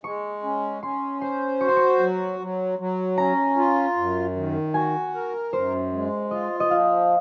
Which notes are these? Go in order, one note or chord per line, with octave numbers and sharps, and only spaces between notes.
G#3 C#6
C#4
C#4 C6
C5 C6
F#4 C#6
C6
C#6
F#3
F#3
F#3
C#4 A#5
F4
F#2
D#3
F#4 G#5
A#4
F#2 C5
G#3
F4 D#5
D#5
F3 F5